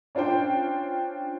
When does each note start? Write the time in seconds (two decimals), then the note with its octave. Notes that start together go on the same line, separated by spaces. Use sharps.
0.15 C#4 D4 F4 C5 G5